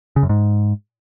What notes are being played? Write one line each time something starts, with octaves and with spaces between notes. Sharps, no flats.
C#3
F#2
G#2